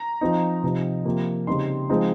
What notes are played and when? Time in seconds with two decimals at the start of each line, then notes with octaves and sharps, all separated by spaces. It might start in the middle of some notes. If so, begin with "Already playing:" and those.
Already playing: A#5
0.21 F3 C4 D#4
0.63 C3 F3 C4 D#4
1.05 C3 F3 A#3
1.47 C#3 G3 C4 D#4 C6
1.89 F3 G#3 C4 D#4